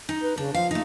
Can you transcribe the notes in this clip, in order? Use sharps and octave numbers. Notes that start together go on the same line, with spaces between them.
D#4
B4
C#3 D4
F3 F5
A3 D#4